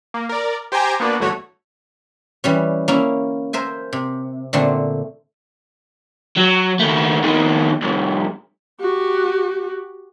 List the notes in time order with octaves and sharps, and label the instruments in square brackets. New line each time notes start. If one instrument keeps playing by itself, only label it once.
[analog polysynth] A#3
A#4 D5
G4 C5 G5 G#5 A#5
A#3 B3 D4 F#4
G1 E2 A3 F#4 C#5
[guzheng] E3 G3 C#4
A#3 C#4 E4
A#4 C5 E5 G#5
C3
A#2 D3 A3 C4
[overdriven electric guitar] F#3
D#2 A3
F2 D#3
C2 F2
[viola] F#4 G4